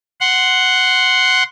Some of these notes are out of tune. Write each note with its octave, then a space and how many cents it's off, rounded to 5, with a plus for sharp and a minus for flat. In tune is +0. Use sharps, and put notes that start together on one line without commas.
F#5 +0 C6 +0